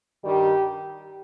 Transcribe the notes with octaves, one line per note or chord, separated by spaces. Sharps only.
G2 D#3 G3 G4